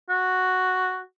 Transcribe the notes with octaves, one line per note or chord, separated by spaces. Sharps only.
F#4